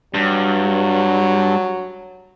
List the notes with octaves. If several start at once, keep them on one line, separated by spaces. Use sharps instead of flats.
G2 F#3